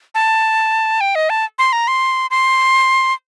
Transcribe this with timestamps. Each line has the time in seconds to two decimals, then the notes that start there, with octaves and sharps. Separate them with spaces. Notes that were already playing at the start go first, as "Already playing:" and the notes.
0.15 A5
1.01 G5
1.15 D#5
1.30 A5
1.59 C6
1.73 A#5
1.88 C6
2.31 C6